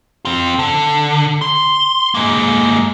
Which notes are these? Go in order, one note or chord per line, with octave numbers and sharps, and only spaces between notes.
C4 F4
D3
C6
G#3 A#3